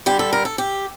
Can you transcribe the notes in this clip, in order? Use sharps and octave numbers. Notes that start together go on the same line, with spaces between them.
G2 D3 G3 G4
A4
A#4
A4
G4